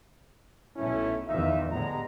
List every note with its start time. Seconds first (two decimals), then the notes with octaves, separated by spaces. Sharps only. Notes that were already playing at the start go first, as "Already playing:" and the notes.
0.77 B1 A3 C#4 E4
1.27 E2 D#3 D#4 F4 E5
1.72 A2 D3 G3 G#3 B3 A#5